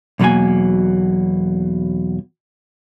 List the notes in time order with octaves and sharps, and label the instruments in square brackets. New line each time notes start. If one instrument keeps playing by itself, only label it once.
[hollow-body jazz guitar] B1 E2 B2 F#3 A#3 G#5